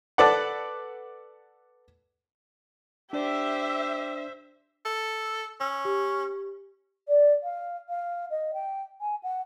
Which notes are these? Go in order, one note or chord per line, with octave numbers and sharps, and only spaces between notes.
A4 B4 D5 F#5
D4 G4 C5 D5 E5
A4
C#4 E6
G4
D5
F5
F5
D#5
G5
G#5
F#5